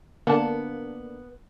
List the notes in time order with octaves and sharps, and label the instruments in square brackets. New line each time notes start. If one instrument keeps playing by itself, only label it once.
[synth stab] D3 A#3 D4 [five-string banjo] B3 A5